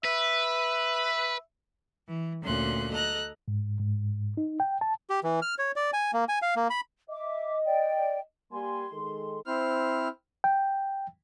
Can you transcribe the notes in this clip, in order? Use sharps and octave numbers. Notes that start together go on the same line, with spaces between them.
B4 E5
E3
D2 A#2 C#4 C6 F#6
A4 D#5 A#5 F#6
G#2
G#2
D#4
G5
A5
G4
E3
F6
C#5
D5
G#5
A#3
G#5
F5
A#3
B5
D#5 E5 D6
D5 G5
G3 A#3 G#5 C6
D#3 G#3 A4
C4 E4 C5 F6
G5